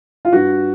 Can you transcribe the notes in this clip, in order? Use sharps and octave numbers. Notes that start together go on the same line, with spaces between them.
F4
G2 F#4